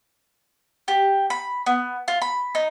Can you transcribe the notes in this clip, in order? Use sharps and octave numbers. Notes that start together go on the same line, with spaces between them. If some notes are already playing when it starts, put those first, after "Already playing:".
G4
B5
B3
F4
B5
D#4